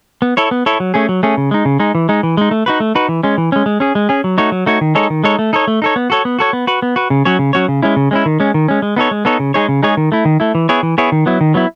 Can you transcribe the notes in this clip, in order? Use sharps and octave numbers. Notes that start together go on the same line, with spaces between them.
B3
E4 A4 C#5
B3
E4 A4 C#5
F#3
A3 C#4 G#4
F#3
A3 C#4 G#4
C#3
G#3 D#4
C#3
G#3 D#4
E3
G#3 D#4
E3
G#3 D#4
A3
D#4 F#4 B4
A3
D#4 F#4 B4
E3
G#3 C#4
E3
G#3 C#4
G#3
C#4 G#4
G#3
C#4 G#4
F#3
A3 D#4 F#4 C#5
F#3
A3 D#4 F#4 C#5
D#3
G#3 D#4 A4 C#5
D#3
G#3 D#4 A4 C#5
A3
D#4 A4 C#5
A3
D#4 A4 C#5
B3
F#4 A4 C#5
B3
F#4 A4 C#5
B3
F#4 B4
B3
F#4 B4
C#3
F#3 C#4 F#4 C#5
C#3
F#3 C#4 F#4 C#5
C#3
G#3 C#4 E4
C#3
G#3 C#4 E4
D#3
G#3 C#4
D#3
G#3 C#4
G#3
B3 D#4 A4 C#5
G#3
B3 D#4 A4 C#5
C#3
G#3 D#4 G#4 C#5
C#3
G#3 D#4 G#4 C#5
D#3
A3 E4
D#3
A3 E4
E3
B3 E4 G#4 C#5
E3
B3 E4 G#4 C#5
D#3
F#3 B3 E4
D#3
F#3 B3 E4